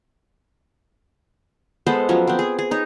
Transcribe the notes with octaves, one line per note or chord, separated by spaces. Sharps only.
G#3 B3 A4 C5
F3 F#3 C#4
B3 C4
G#4
G#4
D#4 C#5